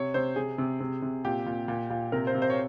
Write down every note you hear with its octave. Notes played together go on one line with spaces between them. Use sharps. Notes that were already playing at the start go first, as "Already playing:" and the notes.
Already playing: C3 C#5
C3 C5
C3 G#4
C3
C3
C3
A#2 G4
A#2
A#2
A#2
C3 A#4
C5
C3
C5
C#5